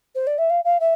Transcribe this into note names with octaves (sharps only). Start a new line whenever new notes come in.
C5
D5
E5
F5
F5
E5